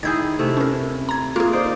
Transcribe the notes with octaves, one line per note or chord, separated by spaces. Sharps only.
D#3 E4 G#4 G6 G#6
C3 A3 E4
C#4 A#4
A#5 G#6
A#3 F4 G#4
D#4 C5 D5